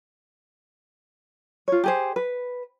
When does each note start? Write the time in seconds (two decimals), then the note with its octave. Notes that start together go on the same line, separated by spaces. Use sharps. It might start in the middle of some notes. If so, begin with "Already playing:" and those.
1.68 F4 C#5
1.84 G4 G#4 C5
2.16 B4